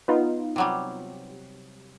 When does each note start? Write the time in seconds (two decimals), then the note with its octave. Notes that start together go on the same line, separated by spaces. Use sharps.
0.08 B3 D#4 F4
0.56 C3 F#3 G3